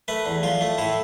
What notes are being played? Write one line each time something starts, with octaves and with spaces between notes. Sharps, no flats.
A3 B4
E2
F3 F4
A3
A2 E4